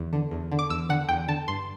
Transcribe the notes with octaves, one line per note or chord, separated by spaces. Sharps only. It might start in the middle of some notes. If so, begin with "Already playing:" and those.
Already playing: E2
D3
E2
D3
D6
E2 E6
D3 F#5
E2 G5
D3 A5
G2 C6